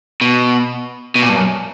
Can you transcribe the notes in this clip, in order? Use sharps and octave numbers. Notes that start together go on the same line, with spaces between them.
B2
B2
A#2
G2
F#2